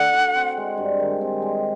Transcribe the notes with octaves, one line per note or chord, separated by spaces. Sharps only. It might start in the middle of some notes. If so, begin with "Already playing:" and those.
Already playing: A3 D4 A4 F#5
F#4
C4
G#3
G2
D#3
C4
G#3